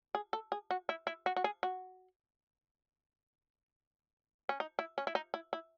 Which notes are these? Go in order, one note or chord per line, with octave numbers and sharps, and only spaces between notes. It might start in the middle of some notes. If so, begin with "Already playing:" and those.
G#4
A4
G#4
F#4
E4
E4
F#4
F#4
G#4
F#4
C#4
D#4
E4
C#4
E4
D#4
E4
E4